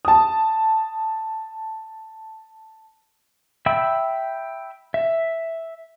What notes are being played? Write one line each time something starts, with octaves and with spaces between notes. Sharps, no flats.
A5 D#6
E5 G5 B5 E6
E5